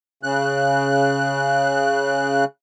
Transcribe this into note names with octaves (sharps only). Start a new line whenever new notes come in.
C#3 F#6